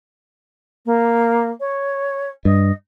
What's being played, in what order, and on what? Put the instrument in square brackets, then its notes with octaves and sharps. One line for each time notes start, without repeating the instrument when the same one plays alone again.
[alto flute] A#3
C#5
[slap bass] G2 [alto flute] D#5